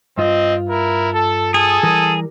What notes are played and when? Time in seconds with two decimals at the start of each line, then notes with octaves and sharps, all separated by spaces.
0.18 G2 C4 F4 D#5
0.69 E4 A#4
1.13 A4
1.54 G#4 A4 D#6
1.83 E3 G3 A#4